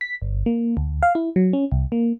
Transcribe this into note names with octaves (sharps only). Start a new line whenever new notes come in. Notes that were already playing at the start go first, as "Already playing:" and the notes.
B6
G1
A#3
D2
F5
E4
F#3
C#4
C2
A#3